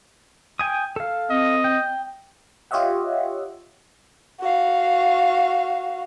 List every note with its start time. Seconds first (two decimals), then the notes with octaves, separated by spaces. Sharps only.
0.59 G5 G#5 D#6
0.96 A4 F5
1.30 C4 D#5
1.64 G5
2.71 F4 G4 C#5 D#5 E5 F#5
4.41 F#4 F5